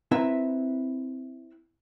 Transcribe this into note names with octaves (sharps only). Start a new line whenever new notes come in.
C4 E4 B4 E5 A#5